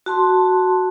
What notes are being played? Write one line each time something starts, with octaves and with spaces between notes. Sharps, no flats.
F#4 A5 C6